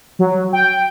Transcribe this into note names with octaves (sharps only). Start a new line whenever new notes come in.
F#3
G5